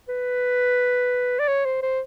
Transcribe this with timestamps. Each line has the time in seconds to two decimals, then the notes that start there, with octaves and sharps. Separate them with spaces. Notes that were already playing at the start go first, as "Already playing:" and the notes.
0.08 B4
1.39 D5
1.48 C#5
1.65 C5
1.82 C5